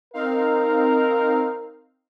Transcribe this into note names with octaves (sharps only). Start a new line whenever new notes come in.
C4 D#4 A#4 F5